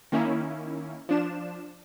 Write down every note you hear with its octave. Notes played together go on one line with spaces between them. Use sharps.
D#3 A#3 C#4 E4
F3 D4 E7